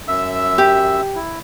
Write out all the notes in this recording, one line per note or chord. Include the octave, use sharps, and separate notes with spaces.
F#2 E5 E6
G4
E4